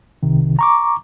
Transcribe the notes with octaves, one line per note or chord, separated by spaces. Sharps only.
C2 C3 D#3
A#5 C#6 D6